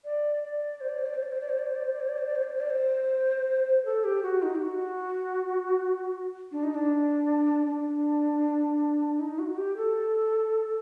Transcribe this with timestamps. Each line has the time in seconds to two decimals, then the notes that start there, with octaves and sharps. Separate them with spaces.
0.04 D5
0.43 D5
0.81 C5
0.89 D5
0.98 C5
1.06 D5
1.14 C5
1.23 D5
1.32 C5
1.40 D5
1.49 C5
1.58 D5
1.66 C5
1.75 D5
1.84 C5
1.92 D5
2.00 C5
2.09 D5
2.18 C5
2.26 D5
2.35 C5
2.43 D5
2.52 C5
2.60 D5
2.70 C5
3.85 A4
4.04 G4
4.23 F#4
4.42 D#4
4.55 G4
4.62 F#4
6.52 D4
6.63 D#4
6.74 D4
7.67 D4
9.19 D#4
9.39 F#4
9.52 F#4
9.57 G4
9.76 A4